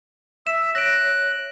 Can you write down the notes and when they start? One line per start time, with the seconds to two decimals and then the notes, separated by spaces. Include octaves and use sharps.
0.47 E5 E6 E7
0.75 C#5 F#6 A#6 D7